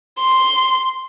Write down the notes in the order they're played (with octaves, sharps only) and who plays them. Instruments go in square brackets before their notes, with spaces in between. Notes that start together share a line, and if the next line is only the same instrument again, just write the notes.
[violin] C6